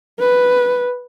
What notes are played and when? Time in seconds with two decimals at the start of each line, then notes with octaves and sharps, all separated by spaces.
0.20 B4